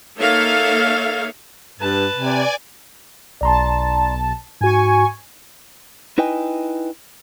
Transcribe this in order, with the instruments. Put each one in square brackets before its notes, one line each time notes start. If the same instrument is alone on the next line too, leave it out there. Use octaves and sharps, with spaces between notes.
[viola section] A#3 D#4 A4 C#5 E5 F5
[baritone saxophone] G2 [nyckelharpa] B4 A5
[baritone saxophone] C3 [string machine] D5 G#5
[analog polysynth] B1 A5 [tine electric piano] D5 A#5 C6
[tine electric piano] G#2 F#4 [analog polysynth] G#5 C#6
[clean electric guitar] D#4 E4 B4 D#5 G5 G#5